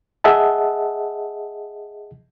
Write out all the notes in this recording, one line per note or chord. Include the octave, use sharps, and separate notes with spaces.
G#4 D#5 E5 F#5 A5